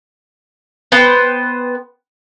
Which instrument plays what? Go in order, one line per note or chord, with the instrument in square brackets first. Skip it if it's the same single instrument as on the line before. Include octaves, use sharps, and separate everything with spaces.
[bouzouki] B3 B4 C5 G5